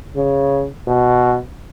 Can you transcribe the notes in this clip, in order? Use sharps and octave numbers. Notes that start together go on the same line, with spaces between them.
C#3
B2